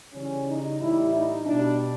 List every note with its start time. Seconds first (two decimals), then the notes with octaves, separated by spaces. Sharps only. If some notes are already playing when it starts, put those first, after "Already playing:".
0.13 C#3 E3 G3 C#4
0.46 D#4
0.80 A2 E3 G3 E4
1.13 D#4
1.45 B2 G3 D4